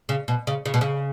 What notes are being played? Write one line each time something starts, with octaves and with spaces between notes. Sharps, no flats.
C#3
B2
C#3
C#3
B2
C#3